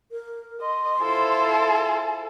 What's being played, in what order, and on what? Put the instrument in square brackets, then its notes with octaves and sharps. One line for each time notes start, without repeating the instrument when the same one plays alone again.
[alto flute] A#4
[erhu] D#5 [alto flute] C6
[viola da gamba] E4 F4 C5 [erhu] A4